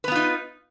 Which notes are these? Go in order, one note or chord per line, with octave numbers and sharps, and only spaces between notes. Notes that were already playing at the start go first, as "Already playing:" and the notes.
B3 D#4 F4 B4